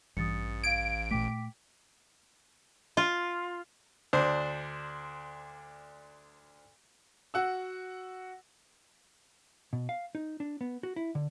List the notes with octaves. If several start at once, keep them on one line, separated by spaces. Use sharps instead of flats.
A1 G2 E3 D#6 A6 C#7
F5 G#6 D7
A#2 A3 G5 D6 B6
F4
D2 D4 C5
F#4 F#5 E6
B2
F5
D#4
D4
B3
F#4
E4
D3